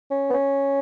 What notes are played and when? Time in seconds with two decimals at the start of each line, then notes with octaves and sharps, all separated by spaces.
0.11 C#4
0.30 B3
0.33 C#4